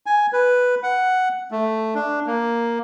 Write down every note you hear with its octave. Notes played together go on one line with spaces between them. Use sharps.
G#5
B4
F#5
A3
D4
A#3